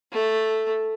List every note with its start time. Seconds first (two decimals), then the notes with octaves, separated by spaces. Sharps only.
0.12 A3